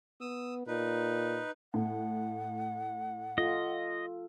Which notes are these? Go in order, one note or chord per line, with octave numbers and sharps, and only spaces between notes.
B3 D#6 E6
A#2 D#4 B4
A2 F#5
F4 A4 D#5